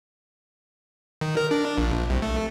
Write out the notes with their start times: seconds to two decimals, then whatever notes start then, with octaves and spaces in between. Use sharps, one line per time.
1.21 D#3
1.37 A#4
1.51 D4
1.78 A#1
2.10 C2
2.22 A3